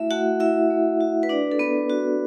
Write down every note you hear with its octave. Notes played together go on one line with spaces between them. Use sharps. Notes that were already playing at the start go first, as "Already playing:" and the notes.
Already playing: A3 E4 F#4 E5
A3 F#4 F#5
A3 E4 E5
A3
F#4
B4
D4 F#4 D5
A4
B3 F#4 B4
F#4